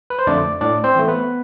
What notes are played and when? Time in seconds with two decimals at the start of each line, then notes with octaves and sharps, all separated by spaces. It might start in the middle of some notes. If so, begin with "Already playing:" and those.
0.10 B4
0.19 C5
0.27 F2 D3 A3 D4 D5
0.61 A2 D4 D5
0.84 C4 C5
0.96 E3 A3
1.07 B3 B4